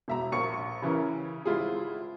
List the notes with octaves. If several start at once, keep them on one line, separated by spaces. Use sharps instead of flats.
E1 E5 A#5
A#1 A#4 C#6 C#7
C#3 E3 C#4 E4 A#4
G#1 E4 F4 G#4